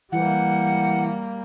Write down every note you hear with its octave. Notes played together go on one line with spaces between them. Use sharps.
E3 G3 A#3 F#5